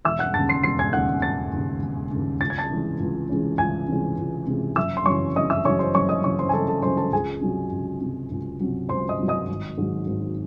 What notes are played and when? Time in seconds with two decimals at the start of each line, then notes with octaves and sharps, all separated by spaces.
0.05 E1 E5 E6
0.19 F#5 F#6
0.34 D#2 C#3 A5 A6
0.49 C6 C7
0.63 E1 C6 C7
0.79 G#5 G#6
0.93 D#2 C#3 F#5 F#6
1.22 E1 A5 A6
1.53 D#2 C#3
1.82 E1
2.11 D#2 C#3
2.41 C#2 A6
2.50 G#6
2.58 A5 A6
2.70 C3 E3 G#3 C#4
3.00 C#2
3.29 C3 E3 G#3 C#4
3.58 C#2 G#5 G#6
3.88 C3 E3 G#3 C#4
4.17 C#2
4.47 C3 E3 G#3 C#4
4.76 F#1 E5 E6
4.97 C6
5.06 F#2 C#3 E3 C#5 C#6
5.36 F#1 D#5 D#6
5.50 E5 E6
5.65 F#2 C#3 E3 C#5 C#6
5.79 C5 C6
5.94 F#1 C#5 C#6
6.09 D#5 D#6
6.24 F#2 C#3 E3 C#5 C#6
6.39 C5 C6
6.49 G#5
6.53 F#1 A4 A5
6.68 A4 A5
6.83 F#2 C#3 E3 C5 C6
6.97 A4 A5
7.12 C#2 G#4 G#5
7.41 C3 F#3
7.72 C#2
8.01 C3 F#3
8.31 C#2
8.60 C3 F#3
8.89 C#2 C5 C6
9.09 D#5 D#6
9.19 C3 F#3
9.28 D#5 D#6
9.48 G#1
9.78 G#2 D#3 F#3
10.07 G#1